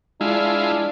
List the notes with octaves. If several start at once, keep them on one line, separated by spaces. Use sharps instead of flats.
G#3 D4 E4 F4